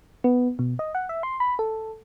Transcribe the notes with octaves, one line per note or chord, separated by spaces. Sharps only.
B3
B2
D#5
F#5
E5
C6
B5
A4